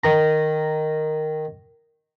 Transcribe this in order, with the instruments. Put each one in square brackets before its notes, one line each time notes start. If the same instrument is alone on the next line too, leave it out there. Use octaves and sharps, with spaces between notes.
[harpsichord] D#3 A#5